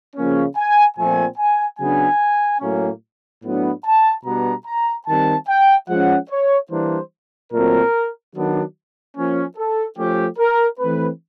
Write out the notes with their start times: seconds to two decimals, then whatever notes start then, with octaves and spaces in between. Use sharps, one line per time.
0.16 C#3 F3 A#3 C#4
0.57 G#5
0.97 A#2 F3 A3 C4 G#5
1.38 G#5
1.79 C#3 F#3 B3 D4 G#5
2.61 A2 F#3 A#3 C#4
3.43 A2 F#3 B3 D4
3.85 A5
4.25 B2 G3 B3 D4 A#5
4.66 A#5
5.07 D#3 G3 C4 A5
5.48 G5
5.89 F3 G#3 C#4 F#5
6.30 C#5
6.71 E3 G3 A#3 D4 C5
7.52 A#2 F#3 A3 C4 A#4
8.34 D#3 F#3 B3 D4
9.16 F3 A#3 C#4
9.57 A4
9.98 F3 A3 C#4 G4
10.39 A#4
10.80 E3 A3 C4 B4